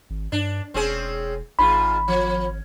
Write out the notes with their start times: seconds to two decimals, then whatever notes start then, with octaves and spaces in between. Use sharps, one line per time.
0.10 G#1
0.32 G2 D4
0.74 E1 C4 C#4 G#4
1.59 G#1 G#2 F4 B5
2.08 F3